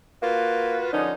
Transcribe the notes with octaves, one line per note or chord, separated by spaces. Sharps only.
A#3 F4 F#4 B4
D3 F3 C#4 D#4